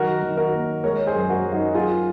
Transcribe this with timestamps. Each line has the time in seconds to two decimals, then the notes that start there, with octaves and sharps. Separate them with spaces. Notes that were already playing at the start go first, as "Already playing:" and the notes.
Already playing: D#3 F#3 F#4 A#4
0.22 D#3
0.37 F#4 A#4
0.53 A#3
0.84 G#3 A#4 C#5
1.07 G#4 C5
1.14 F#2
1.30 F#4 A#4
1.44 F#2
1.52 D#4 F#4
1.74 F#2 F4 G#4